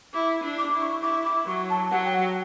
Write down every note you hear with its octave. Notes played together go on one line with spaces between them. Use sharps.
E4 D6
D4
D6
E4
C#6
E4 D6
D6
F#3 C#6
A5
F#3 F#5
G5
F#5